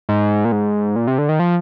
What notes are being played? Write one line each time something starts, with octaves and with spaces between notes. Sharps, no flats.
G#2
A#2
G#2
A#2
C3
D3
D#3
F3